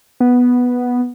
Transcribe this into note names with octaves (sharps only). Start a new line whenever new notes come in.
B3